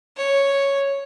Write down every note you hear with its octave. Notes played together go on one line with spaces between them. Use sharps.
C#5